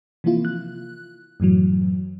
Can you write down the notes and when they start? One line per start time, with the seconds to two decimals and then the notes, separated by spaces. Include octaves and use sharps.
0.24 C3 E3 F3 A#3 E4 F4
0.45 F#6
1.40 F#2 A2 E3 F#3